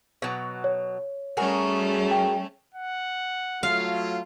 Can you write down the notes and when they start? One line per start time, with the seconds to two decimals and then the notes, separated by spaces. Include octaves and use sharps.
0.22 B2 F#3
0.64 C#5
1.37 G3 A3 C#4 F#4 G#4 A#4
2.11 G5
2.75 F#5
3.63 F#3 A3 F4 F5